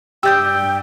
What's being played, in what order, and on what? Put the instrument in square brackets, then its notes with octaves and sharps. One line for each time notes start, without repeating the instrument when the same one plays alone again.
[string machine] G2 G3 [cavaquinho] G4 D5 D#6 [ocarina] G5 [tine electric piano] E6 G6